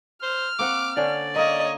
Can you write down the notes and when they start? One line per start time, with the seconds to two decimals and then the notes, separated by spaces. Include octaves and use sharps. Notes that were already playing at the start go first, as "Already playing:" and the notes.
0.23 C5 F6
0.59 A#3 C4 F#5 D6
0.97 D3 C#4 C5 D5
1.36 A#3 A#4 C#5 D#5